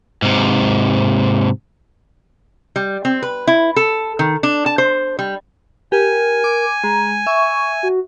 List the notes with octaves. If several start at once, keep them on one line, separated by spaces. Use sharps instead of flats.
G#2 C3
G3
C4
B4
E4
A4
D#3
D4
A5
C5
G3
G4 A#4 G#5
D6
G#3 A#5
E5 C#6
F#4